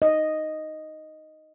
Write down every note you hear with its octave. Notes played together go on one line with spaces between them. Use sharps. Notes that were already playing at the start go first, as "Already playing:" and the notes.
D#5